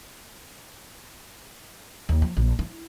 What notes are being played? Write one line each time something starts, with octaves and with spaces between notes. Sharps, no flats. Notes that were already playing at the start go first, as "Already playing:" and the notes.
D#2
F3
A#1
E4